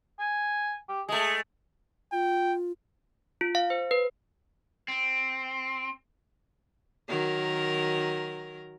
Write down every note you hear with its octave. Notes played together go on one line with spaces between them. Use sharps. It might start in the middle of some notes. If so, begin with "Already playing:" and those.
G#5
G4
G#3 A3 G#4
F4 G5
F4
F5
C5
B4
C4
D#3 F#3 A#4